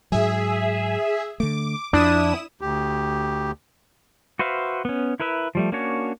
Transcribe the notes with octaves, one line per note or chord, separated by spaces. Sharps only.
G#2 F#3 G#4 E5
D3 A3 D6
F2 F3 D4 E4 D#6 E7
D2 G4
F#4 B4 C5 E5 F5
B3 C#4
E4 A#4 B4 E5
F3 G3 A3
A#3 C#4 D4 F#4 C#5